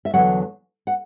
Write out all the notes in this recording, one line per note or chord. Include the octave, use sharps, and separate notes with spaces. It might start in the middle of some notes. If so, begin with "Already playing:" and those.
E5
E2 D3 F#3 F#5
F#5